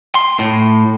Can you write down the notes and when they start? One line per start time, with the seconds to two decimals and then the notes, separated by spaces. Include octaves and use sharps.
0.15 C6
0.39 A2